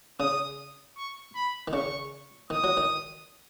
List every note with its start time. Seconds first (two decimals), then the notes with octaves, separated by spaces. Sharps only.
0.19 C#3 D#6
0.97 C#6
1.35 B5
1.68 D#3
1.73 C#3 C#6
2.50 D#3 D#6
2.64 F#3
2.77 D#3